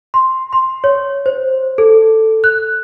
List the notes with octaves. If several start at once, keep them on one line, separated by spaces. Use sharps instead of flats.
C6
C6
C#5
C5
A4
F#6